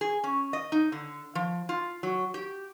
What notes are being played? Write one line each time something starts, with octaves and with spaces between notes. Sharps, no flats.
G#4
C#4
D#5
D#4
D3
F3
F4
F#3
G4